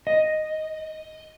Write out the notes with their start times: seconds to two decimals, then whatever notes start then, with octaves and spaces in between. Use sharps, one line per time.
0.07 D#5